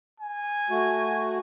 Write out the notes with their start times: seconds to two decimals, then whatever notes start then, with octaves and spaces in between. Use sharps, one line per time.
0.21 G#5
0.70 A3 F#4